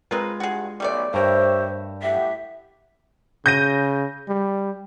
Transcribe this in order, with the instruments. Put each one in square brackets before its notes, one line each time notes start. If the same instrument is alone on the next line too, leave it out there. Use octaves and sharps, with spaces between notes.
[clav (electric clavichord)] G#3 F4 [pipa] C4 A#4 B4
[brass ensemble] G2 [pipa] F#4 G#4
[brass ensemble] B1 [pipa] G3 A3 D5
[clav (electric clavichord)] G2 A#4 [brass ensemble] G4 C#5 E5 [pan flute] C5
[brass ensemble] A2 G4 F#5 [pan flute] E5
[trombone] C#3 [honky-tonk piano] G6 A#6 D#7
[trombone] G3